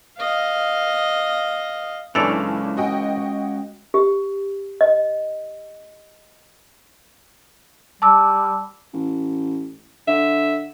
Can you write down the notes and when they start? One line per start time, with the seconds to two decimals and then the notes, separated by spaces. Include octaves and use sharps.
0.17 D#5 F5
2.15 F#1 E3 G#3 C#4 D4 A4 D5 F7
2.77 F#4 D#5 G5
3.94 G4
4.81 D#5
8.02 G3 A5 D6 E6
8.93 A1
10.07 D3 E5